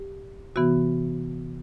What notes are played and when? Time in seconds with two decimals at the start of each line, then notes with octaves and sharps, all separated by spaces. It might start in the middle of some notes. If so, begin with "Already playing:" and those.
Already playing: G4
0.56 C3 E3 B3 F#4